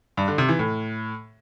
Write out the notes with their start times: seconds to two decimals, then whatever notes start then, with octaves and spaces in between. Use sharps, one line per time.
0.17 G2
0.28 D3
0.38 C3
0.49 E3
0.59 A2